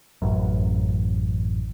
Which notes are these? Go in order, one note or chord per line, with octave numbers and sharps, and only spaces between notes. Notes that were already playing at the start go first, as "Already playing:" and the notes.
A1 F#2